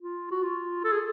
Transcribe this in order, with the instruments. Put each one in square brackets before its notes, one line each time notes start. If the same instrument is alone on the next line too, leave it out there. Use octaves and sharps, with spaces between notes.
[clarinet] F4
F#4
F4
A4
G#4